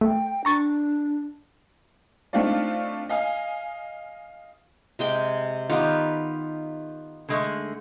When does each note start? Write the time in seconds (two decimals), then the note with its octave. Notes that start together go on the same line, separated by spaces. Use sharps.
0.01 A3 G5
0.45 D4 A#5 C#6 A6
2.33 A3 C4 D4 D#4 F4 D5
3.09 D#5 F5 G#5
4.99 C3 G#3 G5
5.70 D#3 B3 F4 G4
7.29 D3 G#3 A3